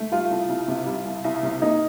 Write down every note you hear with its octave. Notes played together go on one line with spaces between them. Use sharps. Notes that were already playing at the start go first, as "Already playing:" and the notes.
Already playing: A3
G3 F4
C2
C2
C3
G3
C2
C2
C3
A#3 D#4